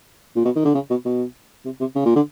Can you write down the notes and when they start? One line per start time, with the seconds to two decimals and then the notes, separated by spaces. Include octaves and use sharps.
0.36 A#2
0.45 B2
0.55 D#3
0.65 D3
0.75 C#3
0.90 B2
1.05 B2
1.65 C3
1.80 C3
1.95 C#3
2.06 A#2
2.16 D3